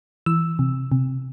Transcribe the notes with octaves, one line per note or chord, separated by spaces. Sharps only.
E3 E6
C3
C3